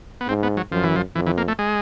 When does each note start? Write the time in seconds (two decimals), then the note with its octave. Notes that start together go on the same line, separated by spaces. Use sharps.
0.21 B3
0.28 G#2 C4
0.43 B3
0.57 F#3
0.72 F#2 F3
0.83 E3
0.96 F3
1.16 F2 E3
1.26 E3
1.38 A#3
1.48 A3
1.59 G#3